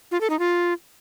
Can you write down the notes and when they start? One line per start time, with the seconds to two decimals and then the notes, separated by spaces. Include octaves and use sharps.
0.11 F4
0.21 A4
0.30 D#4
0.39 F4